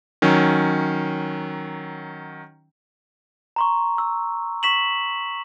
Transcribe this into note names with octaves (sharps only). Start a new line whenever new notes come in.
D#3 F#3 C#4
A#5 C6 C#6
E6
C#6 B6 E7 F#7